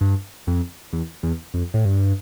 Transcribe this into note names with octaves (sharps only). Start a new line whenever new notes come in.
G2
F2
E2
E2
F2
A2
G2